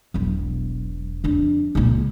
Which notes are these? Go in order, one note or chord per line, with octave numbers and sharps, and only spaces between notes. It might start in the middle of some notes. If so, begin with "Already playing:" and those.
E1 B1
F2 D4
C#2 A#2